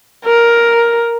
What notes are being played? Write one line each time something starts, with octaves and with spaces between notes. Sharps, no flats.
A#4